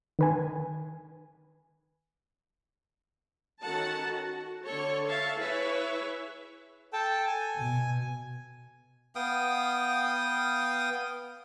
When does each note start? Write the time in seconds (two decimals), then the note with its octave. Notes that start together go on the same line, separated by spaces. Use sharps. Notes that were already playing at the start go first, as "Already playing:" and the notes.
0.19 D#3 B4 G#5
3.62 D#3 C#4 F#4 A4 F#5 A5
4.05 F#4
4.64 D3 A4 C#5
5.06 C#5 E5 F5 A5
5.38 E4 G#4 B4 C#5 E5
6.93 A4 G5 A5
7.27 G#5
7.59 B2
9.15 B3 F5 G5 D#6